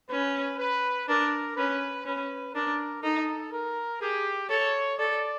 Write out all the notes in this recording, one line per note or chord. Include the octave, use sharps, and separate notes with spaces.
C#4 B4
B4
D4 A#4
C#4 B4
C#4 B4
D4 A#4
D#4 A4
A#4
G4 G#4
A4 C#5
A4 D5